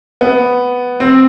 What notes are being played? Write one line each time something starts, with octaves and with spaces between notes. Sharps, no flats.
B3
C4